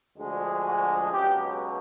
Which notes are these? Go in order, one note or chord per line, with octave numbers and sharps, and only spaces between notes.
D2 D3 F3 G#3
F#4
C#2 B2 F#3 G4